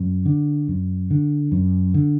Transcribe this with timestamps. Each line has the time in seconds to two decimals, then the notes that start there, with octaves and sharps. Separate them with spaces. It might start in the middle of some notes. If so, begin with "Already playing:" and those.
Already playing: F#2
0.26 D3
0.68 F#2
1.11 D3
1.52 F#2
1.94 D3